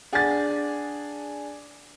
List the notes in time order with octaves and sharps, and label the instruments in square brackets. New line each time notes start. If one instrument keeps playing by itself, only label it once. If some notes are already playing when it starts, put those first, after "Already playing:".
[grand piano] D4 G#4 [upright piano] F#5 A6